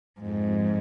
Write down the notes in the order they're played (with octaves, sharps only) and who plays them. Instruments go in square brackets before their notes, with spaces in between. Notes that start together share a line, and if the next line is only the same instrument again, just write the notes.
[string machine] F2 [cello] G#2